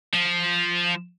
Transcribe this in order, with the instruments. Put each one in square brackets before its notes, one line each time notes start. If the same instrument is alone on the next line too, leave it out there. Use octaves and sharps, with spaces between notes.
[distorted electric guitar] F3